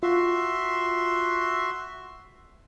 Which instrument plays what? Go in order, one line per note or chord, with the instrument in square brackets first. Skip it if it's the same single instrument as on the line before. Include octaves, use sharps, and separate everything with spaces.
[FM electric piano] F4 [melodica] F#4 E5 C6